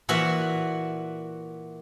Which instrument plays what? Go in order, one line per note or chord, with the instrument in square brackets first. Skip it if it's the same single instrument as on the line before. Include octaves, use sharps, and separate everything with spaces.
[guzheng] A#2 E3 F#4 E5 F#5